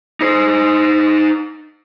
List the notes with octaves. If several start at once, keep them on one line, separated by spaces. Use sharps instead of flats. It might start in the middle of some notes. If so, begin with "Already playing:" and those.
D#4 C5